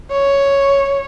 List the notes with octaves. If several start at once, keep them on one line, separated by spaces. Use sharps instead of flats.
C#5